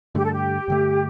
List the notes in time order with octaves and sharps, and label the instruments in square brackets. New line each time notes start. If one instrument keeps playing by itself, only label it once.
[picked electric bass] G2 D3 A3 [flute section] G4
[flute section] A4
G4
[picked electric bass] G2 D3 A3